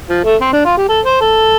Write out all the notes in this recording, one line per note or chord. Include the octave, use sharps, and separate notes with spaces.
F3
A3
C4
D4
F4
G4
A4
C5
A4